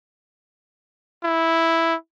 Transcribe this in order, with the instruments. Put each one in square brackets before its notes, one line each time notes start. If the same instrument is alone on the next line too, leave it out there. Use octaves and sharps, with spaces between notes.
[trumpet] E4